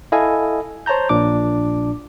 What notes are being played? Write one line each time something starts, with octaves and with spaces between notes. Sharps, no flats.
E4 A4 D#5 F5 G#5
C5 C#5 A5 A#5 G6
A#1 A#2 D4 D6